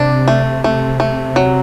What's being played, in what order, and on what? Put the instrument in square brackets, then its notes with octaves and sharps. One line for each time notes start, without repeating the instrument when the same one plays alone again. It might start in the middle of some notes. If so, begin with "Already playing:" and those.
Already playing: [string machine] C3 [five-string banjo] D4
[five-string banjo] A3
A3
A3
F#3